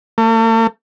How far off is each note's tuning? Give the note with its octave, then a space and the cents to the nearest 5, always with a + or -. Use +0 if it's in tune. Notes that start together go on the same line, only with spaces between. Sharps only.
A3 +45